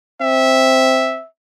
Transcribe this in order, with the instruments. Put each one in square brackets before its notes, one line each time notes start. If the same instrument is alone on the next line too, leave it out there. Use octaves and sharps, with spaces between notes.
[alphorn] C4 [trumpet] E5